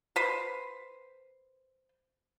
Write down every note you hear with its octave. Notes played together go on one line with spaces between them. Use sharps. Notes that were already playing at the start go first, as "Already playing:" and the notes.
B4 C5